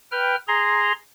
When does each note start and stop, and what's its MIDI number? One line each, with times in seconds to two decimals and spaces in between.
0.11 0.35 71
0.11 0.35 79
0.11 0.35 89
0.48 0.92 68
0.48 0.92 82
0.48 0.92 84